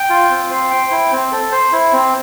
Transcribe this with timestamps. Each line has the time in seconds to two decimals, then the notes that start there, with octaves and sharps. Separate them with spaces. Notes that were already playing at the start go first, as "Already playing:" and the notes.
Already playing: G5
0.10 F4
0.30 C4
0.51 C5
0.71 G5
0.91 E4
1.12 C4
1.32 A4
1.52 C5
1.72 E4
1.93 C4